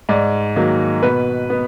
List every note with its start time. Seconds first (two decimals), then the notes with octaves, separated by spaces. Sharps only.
0.09 G#2 D5
0.56 D#3 F#3 A#3
1.03 B2 B4
1.50 B3